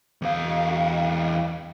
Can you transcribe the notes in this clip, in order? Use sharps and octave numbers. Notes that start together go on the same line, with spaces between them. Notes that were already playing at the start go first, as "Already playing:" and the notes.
E2 F5